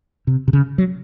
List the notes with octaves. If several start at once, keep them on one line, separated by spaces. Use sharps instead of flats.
C3
C3
C#3
F#3